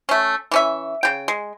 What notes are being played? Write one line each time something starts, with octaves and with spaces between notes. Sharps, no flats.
A3 C#4
E3 C#4 E5
C#3 G5
G#3